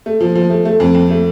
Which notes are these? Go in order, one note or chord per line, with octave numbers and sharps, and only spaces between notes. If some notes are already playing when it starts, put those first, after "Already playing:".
A3
F3
F3
A3
A3
F2
F2
A3